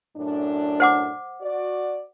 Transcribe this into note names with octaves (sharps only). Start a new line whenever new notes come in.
F#2 A2 D4
C5 F#5 D6
F#4 D5